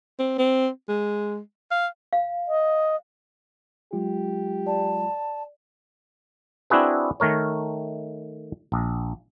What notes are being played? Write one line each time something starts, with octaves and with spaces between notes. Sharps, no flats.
C4
C4
G#3
F5
F5
D#5
F#3 G#3 F4 G4
D5 A5
C4 D4 E4 F#4 G#4 B4
D#3 A3 A#4 C#5
A#1